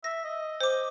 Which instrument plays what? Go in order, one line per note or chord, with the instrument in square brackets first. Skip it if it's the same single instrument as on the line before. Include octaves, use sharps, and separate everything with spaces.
[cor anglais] E5 [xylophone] A#6
[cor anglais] D#5
[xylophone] C5 D6